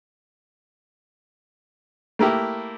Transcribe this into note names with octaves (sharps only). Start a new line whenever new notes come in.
A3 A#3 E4 G4